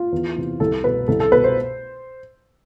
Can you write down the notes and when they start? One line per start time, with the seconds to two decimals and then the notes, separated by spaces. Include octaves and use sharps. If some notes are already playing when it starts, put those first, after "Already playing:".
Already playing: F4
0.12 E2
0.36 C3 E3
0.60 C2 A4
0.84 B2 B4
1.08 C2 A4
1.20 A4
1.32 B2 B4
1.44 C5